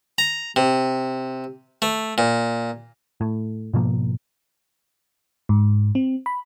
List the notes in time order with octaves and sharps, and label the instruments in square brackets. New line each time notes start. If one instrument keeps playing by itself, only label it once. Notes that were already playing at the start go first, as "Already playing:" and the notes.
[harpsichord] A#5
C3
A3
A#2
[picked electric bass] A2
G#2 B2 F3 A#3
[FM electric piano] G#2
C4
B5